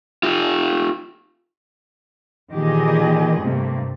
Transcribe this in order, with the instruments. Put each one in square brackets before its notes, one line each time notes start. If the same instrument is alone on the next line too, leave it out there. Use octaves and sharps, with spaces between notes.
[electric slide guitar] F4 G4
[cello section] A#2 D#3 E3 G4 G#4 D#5
G2 C3 A3 A#3